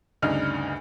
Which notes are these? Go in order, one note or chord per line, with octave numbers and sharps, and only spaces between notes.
D2 G2 C#3 D4 D#4 F6